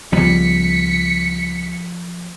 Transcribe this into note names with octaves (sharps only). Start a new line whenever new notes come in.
C#2 F3 G3 B3 B6 C#7